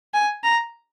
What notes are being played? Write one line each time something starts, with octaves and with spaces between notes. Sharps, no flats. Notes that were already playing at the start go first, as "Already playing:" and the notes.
G#5
A#5